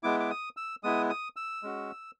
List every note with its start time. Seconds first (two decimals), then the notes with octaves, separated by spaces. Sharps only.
0.03 G#3 B3 E4 D6
0.20 D6
0.30 D#6
0.57 E6
0.83 G#3 B3 E4 D#6
1.10 D#6
1.36 E6
1.63 G#3 C#4 F#4